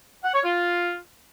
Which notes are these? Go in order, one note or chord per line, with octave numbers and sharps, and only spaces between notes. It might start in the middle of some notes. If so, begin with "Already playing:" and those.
F#5
C#5
F4